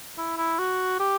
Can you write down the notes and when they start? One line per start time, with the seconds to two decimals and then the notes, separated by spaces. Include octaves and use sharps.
0.18 E4
0.38 E4
0.59 F#4
1.00 G4